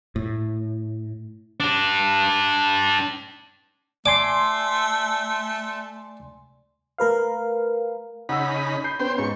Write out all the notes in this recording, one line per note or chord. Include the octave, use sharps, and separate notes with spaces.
A2
D4 G4
A3 D5 G#5 C6 D6
A3 A#4 B4 F5
C#3 D#4 F#5 B5 E6
D#7
B5 G6 C7
B3 C#4 C5 G5
G#2 C#6